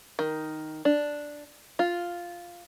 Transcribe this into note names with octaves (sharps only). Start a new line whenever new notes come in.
D#3
D4
F4